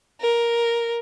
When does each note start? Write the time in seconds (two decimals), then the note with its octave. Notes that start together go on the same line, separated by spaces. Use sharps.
0.21 A#4